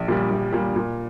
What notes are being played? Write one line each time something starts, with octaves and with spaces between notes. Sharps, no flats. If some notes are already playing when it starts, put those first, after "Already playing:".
Already playing: A#1
A#2 G3
A#1
A#2 G3
A#2